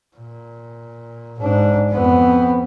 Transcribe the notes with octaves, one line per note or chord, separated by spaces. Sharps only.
A#2
G#2 D4
F2 B3